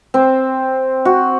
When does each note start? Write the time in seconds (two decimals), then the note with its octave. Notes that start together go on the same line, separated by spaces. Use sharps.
0.14 C4
1.05 F#4